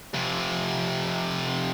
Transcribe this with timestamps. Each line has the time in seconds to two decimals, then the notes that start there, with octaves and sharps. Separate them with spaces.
0.14 F2 C3